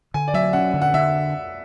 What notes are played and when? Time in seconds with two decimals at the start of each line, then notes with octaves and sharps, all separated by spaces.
0.14 D3 G#5
0.28 D5
0.34 F#3 E5
0.53 C#4 F#5
0.73 D3
0.82 F#5
0.94 D3 E5